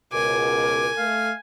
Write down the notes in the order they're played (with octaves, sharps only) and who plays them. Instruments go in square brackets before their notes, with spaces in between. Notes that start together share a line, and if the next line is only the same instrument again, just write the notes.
[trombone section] C#2 B2 [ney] A#4 [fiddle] G#5 [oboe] D6
[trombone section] A3 [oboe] F5